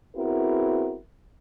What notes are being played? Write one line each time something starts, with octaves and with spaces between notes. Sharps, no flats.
B3 C4 E4 F#4 G#4 A#4